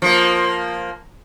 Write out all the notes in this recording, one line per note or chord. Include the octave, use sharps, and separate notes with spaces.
F3 A#3